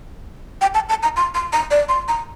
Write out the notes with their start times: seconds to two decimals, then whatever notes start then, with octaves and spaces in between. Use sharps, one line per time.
0.61 G5
0.74 A5
0.89 A5
1.03 A#5
1.17 C6
1.35 C6
1.53 A#5
1.71 D5
1.89 C6
2.08 A#5